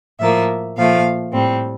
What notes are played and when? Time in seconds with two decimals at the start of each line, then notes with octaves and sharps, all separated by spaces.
0.19 A2 F3 A#3 E5
0.76 A#2 F3 A3 F5
1.33 A2 G3 C4